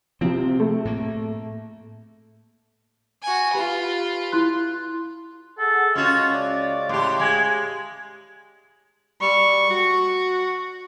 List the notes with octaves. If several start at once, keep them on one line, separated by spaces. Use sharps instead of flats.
C3 F3 C4
A3
A2 A#3
F#4 G#5
F4 G4 B4
E4 C6 F#6
G#4 A4 F#5
C#2 C#4 F4 F#4 D#5 F5
D5
A2 G4 C6
G#3 G#5
G3 C#6
F#4